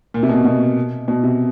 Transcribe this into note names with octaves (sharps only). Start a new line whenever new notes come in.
A#2
C3
B2
B2
B2
C3